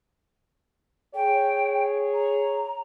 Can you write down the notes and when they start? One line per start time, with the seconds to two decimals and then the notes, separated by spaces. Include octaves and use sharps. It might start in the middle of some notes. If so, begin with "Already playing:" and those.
1.15 G#4 C#5 G5
2.14 A#5